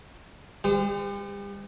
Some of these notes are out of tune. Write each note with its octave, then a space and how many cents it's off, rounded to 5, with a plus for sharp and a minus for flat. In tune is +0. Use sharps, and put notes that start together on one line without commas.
G3 +40 C5 -40